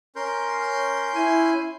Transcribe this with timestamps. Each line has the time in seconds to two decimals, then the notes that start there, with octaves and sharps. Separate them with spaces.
0.16 C#4 A#4 C6 G6
1.15 E4 G#5